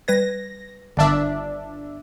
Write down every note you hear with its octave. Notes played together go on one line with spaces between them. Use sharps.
G3 B4 G#6 A#6
G1 D3 D#3 D4 E5